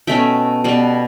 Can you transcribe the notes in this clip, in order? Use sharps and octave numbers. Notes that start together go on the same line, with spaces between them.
B2 A3 C#4 E5 G5
B2 G3 B3